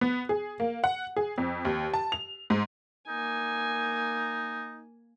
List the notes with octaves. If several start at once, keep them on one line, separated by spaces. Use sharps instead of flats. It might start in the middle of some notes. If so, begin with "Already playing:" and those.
B3
G#4
A#3
F#5
G#4
F2
D#2
A5
F7
G#2
A#3 D#4 G#5